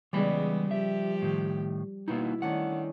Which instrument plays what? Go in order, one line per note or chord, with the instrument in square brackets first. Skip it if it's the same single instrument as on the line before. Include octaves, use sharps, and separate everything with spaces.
[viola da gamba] C#3 G#3 B3 [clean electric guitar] E3 B5 [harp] G3
[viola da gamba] F3 G4 [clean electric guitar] E5
[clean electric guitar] A2 D#3
[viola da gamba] B2 [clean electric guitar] A#3 B3 D#4 [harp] E4
[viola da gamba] D#3 [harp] A3 C#4 D4 [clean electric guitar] F#5